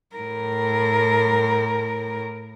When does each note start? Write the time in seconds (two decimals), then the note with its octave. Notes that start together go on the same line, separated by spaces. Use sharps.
0.16 A2 A#4